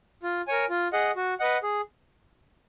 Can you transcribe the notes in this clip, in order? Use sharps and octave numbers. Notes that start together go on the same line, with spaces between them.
F4
A#4 C#5 G#5
F4
G#4 D#5 F#5
F#4
B4 D#5 F#5
G#4